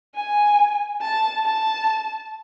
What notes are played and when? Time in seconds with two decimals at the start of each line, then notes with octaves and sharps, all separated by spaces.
0.15 G#5
1.01 A5
1.44 A5